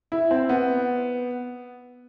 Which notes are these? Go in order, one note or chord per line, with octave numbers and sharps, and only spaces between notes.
E4
C4
B3